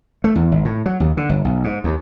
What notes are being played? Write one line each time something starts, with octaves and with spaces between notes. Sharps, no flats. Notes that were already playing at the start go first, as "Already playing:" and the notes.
A3
E2
G#1
A2
F#3
D#2
D3
G1
B1
G#2
D#2